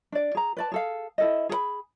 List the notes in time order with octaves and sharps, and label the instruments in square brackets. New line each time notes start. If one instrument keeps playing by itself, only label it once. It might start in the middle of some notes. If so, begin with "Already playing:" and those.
[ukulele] D4 D5
G#4 A#5
B4 D5 A5
G#4 A4 F5
E4 A4 D#5
G#4 A4 B5